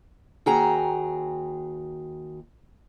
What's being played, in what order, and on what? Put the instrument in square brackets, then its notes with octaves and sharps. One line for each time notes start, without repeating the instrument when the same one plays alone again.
[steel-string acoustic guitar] D#2 F#4 G#4 G5 A#5